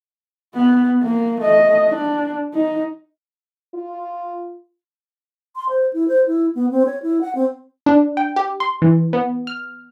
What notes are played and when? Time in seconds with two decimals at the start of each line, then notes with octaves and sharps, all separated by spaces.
0.55 B3
1.03 A#3
1.41 A3 D#5
1.88 D4
2.54 D#4
3.74 F4
5.56 C6
5.69 C5
5.93 E4
6.08 C5
6.26 E4
6.55 B3
6.71 C4
6.86 C#5
7.02 E4
7.21 F#5
7.35 C4
7.86 D4
8.17 G5
8.36 G4
8.60 C6
8.82 E3
9.13 B3
9.47 F6